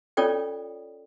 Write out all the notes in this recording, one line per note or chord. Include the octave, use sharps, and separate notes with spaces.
C#4 F4 A4 C#5 D5 G5